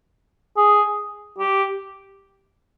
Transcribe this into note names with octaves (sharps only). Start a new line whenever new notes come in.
G#4
G4